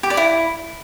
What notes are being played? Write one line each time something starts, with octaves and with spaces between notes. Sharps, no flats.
G4
D5
E4